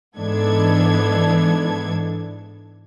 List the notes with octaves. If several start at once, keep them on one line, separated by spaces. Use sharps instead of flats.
G#2 E3 B3 D4 A4 G#6